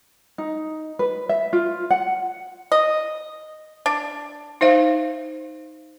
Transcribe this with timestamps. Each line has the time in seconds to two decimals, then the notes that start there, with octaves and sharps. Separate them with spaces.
0.38 D#4
0.99 B4
1.29 E5
1.53 F4
1.91 F#5
2.72 D#5
3.86 D4
4.61 D#4 C5 E5 F5